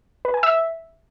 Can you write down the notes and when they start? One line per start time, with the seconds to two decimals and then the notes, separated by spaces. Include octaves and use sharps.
0.25 B4
0.34 G#5
0.43 E5